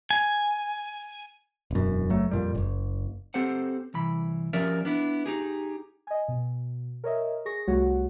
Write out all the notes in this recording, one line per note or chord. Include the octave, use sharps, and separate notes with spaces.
G#5
E1 F#2
F#1 F#3 A3
F2 A#2 G3
F#1
C4 G4 A4 C5 F#5
C2 E3 B5
F3 C#4 G4 A#4 D5 E5
B3 D4 E4
D#4 G4 G#4
D#5 G#5
B2
A#4 C#5 D#5 E5
G#4 C#6 A#6
C2 G3 A3 F#4 C#5 F#5